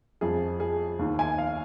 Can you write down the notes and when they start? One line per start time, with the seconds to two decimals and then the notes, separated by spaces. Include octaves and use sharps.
0.21 F2 F3 G#4
0.60 G#4
0.99 D#2 D#3
1.19 G#5
1.38 F5